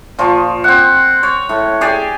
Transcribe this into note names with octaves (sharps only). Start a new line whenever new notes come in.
A#2 F3 C#6
C4 F#5
C#5
A2
G4 G#4 D5